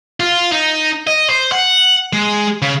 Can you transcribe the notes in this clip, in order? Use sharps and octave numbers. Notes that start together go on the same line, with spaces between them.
F4
D#4
D#5
C5
F#5
G#3
C#3